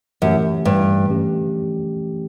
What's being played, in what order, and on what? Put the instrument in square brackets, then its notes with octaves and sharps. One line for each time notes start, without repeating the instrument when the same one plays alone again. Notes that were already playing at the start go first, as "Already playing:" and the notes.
[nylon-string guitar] F#2 [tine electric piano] E3 A3 C#4 G4
[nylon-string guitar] G2
[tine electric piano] E3 A3 C#4 G4